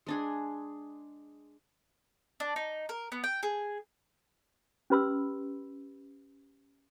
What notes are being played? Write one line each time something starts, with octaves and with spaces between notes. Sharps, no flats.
G#3 D4 G#4
D4
D#4
A#4
B3
G5
G#4
C#4 G4 B4 B5 C6 E6